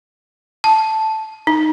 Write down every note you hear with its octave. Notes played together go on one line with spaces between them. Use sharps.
A5
D#4